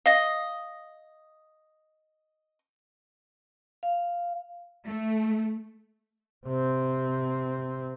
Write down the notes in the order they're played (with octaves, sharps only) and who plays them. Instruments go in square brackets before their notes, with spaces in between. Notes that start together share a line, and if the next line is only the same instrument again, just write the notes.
[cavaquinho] D#5 [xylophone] F5 A#6
[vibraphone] F5
[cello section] A3
[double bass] C3 C4